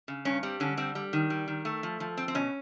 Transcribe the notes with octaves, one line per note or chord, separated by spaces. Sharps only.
C#3
G2 C#4
G3 C4
D3 C#4
G3 C4
G3
D#3
G3
D#3
A3
F3
F3
C4
C4
B2 C#4